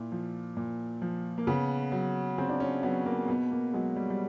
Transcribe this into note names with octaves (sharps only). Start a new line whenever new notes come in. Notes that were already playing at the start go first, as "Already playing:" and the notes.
Already playing: A#2 E4
F3
A#2
F3
A#3
C#3 B3
F#3
C#3 C4
D4
C#4
F#3 B3
A#3
B2 B3
A#3
F#3 G#3
G3
G3